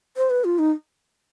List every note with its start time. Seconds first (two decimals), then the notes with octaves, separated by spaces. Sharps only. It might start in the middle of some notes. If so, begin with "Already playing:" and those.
0.17 C5
0.30 B4
0.44 F4
0.59 D#4